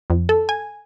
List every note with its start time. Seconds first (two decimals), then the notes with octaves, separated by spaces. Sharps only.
0.10 F2
0.29 A4
0.49 G#5